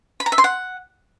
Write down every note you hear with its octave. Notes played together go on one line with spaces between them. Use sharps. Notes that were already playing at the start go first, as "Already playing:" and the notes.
B5
A#5
E5
C6
F#5